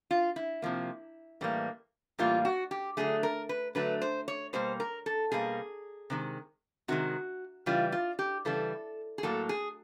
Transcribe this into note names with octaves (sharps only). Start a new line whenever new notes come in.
F4
E4
C3 F3 A#3
A2 E3 G3 A#3
A2 E3 G3 A#3 F4
F#4
G4
D3 F#3 A3 G#4
A#4
B4
D3 F#3 A3 B4
C5
C#5
B2 G3 A#3 C5
A#4
A4
B2 G3 A#3 G#4
C3 D#3 G#3
C3 D#3 G#3 F#4
C#3 E3 G3 F4
F4
G4
C#3 E3 G3 A4
G#4
A2 F#3 A#3 A4
G#4